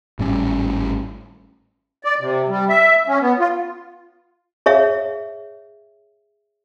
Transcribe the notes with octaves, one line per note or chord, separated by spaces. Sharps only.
G#1 A2 G3 C#4
D5
C3
G3
E5
C#4
B3
F4
G#4 C#5 E5 F5